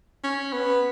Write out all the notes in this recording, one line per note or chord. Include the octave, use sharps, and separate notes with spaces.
C#4
B3